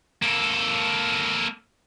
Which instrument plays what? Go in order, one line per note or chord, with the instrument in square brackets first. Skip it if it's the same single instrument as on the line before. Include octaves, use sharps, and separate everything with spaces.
[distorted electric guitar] A#3 A4